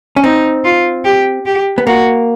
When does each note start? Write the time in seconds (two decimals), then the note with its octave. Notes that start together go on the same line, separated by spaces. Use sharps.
0.16 C#4
0.23 C4 D#4
0.64 F4
1.05 G4
1.46 G4
1.78 B3
1.87 A#3 F#4